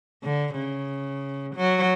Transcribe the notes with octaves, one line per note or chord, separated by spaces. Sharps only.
D3
C#3
F#3